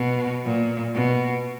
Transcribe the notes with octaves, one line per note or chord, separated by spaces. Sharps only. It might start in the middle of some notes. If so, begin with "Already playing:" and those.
Already playing: B2
A#2
B2